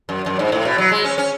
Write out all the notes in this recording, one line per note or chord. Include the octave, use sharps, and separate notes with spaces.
F#2
F#2
G#2
A2
B2
F#3
G#3
C#4
C#4